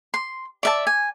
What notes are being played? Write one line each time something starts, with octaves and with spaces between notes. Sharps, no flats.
C6
D5 E5 A5
G#5